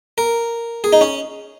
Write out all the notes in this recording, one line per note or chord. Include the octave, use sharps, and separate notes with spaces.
A#4
G#4
D#4
C#4